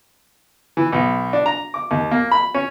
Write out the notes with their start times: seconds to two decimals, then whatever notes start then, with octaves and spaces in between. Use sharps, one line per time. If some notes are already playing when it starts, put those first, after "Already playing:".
0.77 E3
0.92 B1
1.33 D4
1.46 A#5
1.74 D6
1.91 D#2
2.11 A#3
2.31 B5
2.54 C#4